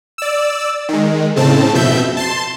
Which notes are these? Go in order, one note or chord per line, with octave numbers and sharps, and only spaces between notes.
D5 E6
D#3 G#3
A2 C#3 C4 A5
F2 B2 E5 G6
A5 C6